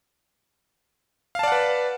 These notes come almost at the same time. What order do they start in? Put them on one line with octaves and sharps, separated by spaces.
F5 A5 D5 F#5 B4